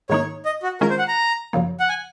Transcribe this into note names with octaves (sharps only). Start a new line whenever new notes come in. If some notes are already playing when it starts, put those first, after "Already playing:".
G#2 D#3 A#3 D#4 C#5
D#5
F#4
D#3 G#3 C#4 F4 G#4 A#4
C5
F#5
A#5
F#2 C#3 F3 A#3
F#5
G#5